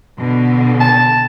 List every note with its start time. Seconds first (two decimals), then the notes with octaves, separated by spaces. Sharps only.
0.17 B2 D3
0.80 A5